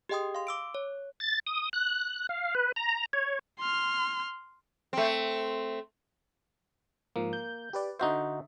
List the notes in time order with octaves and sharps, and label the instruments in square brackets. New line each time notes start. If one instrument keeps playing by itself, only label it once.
[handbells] G4 G#4 D#5 G5 C6 D#6
F5 C6
D6 E6 D7
C#5
[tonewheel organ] A6
D#6
F#6
F5
B4
A#5
C#5
[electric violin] C6 F6
[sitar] A3 C4
[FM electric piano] G#2 F3 [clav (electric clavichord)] A#3
[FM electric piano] G6
G4 B4 D5
[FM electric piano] D3 E5 [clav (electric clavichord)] D#4 F#4 C5